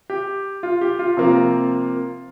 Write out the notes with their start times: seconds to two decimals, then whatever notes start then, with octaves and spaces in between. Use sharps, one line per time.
0.10 G4
0.63 F4
0.81 G4
0.99 F4
1.17 C3 F3 A#3